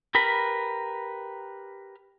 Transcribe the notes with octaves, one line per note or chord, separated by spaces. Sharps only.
G4 A#4 B4 B5